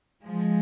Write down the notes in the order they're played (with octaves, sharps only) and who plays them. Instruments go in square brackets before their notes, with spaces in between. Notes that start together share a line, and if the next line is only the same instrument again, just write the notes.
[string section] F3 G#3